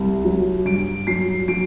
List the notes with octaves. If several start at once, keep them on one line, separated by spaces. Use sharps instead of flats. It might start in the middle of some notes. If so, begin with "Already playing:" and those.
Already playing: C2
F#3
G2 D7
F#3 C7
F#3 D7